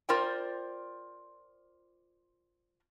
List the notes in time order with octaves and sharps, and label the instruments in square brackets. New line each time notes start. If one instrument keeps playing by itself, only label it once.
[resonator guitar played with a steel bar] F4 A#4 C5 D5 G5